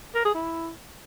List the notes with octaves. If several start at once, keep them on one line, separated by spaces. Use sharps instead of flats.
A#4
G#4
E4